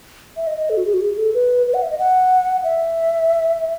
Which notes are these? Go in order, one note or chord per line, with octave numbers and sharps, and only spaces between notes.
E5
D#5
D#5
A4
F#4
G#4
F#4
G#4
A4
B4
B4
F#5
E5
D#5
F#5
E5